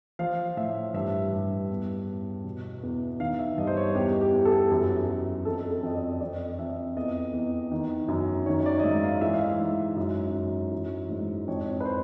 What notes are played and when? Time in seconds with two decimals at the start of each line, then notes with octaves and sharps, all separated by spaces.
0.19 F3 F5
0.57 A2 E5
0.94 G2 E5
1.32 G2
1.70 E2
2.07 E2
2.44 B2
2.83 E2
3.20 D#3 F5
3.39 E5
3.58 G2 D#5
3.67 C5
3.77 C#5
3.95 E2 G4
4.21 G4
4.33 E2
4.45 A4
4.71 F#2
5.09 F#2
5.45 F2 A4
5.70 A4
5.83 F2 D#5
5.96 D5
6.21 F2 D5
6.59 F2 E5
6.96 E2 D#5
7.33 E2
7.71 D#3
8.08 F#2
8.46 D#3 C#5
8.60 C#5
8.66 D5
8.79 D#5
8.84 G#2 E5
9.04 F5
9.21 E3 E5
9.33 F5
9.44 E5
9.59 G#2
9.97 F#2
10.34 F#2
10.72 E3
11.10 G#2
11.47 F2 C#5
11.80 B4
11.85 C5